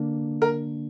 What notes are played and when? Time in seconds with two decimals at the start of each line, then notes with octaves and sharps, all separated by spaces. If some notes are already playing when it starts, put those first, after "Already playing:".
Already playing: D3 A#3 D4
0.42 A#4